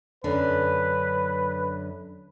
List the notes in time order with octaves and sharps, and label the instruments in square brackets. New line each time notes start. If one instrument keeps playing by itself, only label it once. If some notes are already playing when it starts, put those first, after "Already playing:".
[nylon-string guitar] F#2 D3 D4 [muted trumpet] B4